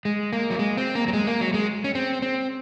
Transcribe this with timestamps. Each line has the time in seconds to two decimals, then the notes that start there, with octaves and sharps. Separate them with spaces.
0.05 G#3
0.33 A#3
0.50 F#3
0.59 G#3
0.77 C4
0.95 A#3
1.08 F#3
1.13 G#3
1.27 A#3
1.41 F#3
1.54 G#3
1.84 C#4
1.95 C4
2.22 C4